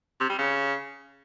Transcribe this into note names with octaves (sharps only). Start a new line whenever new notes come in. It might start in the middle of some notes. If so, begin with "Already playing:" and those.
C3
G3
C#3